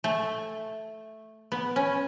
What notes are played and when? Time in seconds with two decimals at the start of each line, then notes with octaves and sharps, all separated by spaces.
0.04 A3
1.52 B3
1.76 C#4